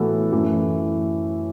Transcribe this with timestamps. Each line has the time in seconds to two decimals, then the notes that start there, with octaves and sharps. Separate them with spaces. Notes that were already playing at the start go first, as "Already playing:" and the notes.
Already playing: A2 E3 B3 F#4 A4
0.32 F#2 E3 A3